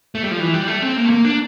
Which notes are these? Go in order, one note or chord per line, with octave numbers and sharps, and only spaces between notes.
A3
G3
F3
E3
G3
A3
C4
A#3
A3
A#3
D4